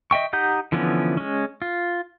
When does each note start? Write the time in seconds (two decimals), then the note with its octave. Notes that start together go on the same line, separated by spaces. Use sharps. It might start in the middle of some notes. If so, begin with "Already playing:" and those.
0.11 D#5 E5 G5 C#6
0.33 D#4 G4 F#5 A#5 G6
0.72 D3 E3 F3 B3 C#4
1.17 G#3 C#4
1.62 F4